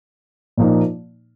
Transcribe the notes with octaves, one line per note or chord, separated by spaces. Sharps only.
A#2 F3 A#3 D#4